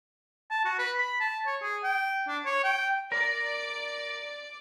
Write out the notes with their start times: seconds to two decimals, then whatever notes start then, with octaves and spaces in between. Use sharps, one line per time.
0.50 A5
0.65 F#4
0.78 B4
0.98 B5
1.20 A5
1.46 C#5
1.62 G#4
1.83 G5
2.28 D4
2.45 C#5
2.64 G5
3.12 A#4 D5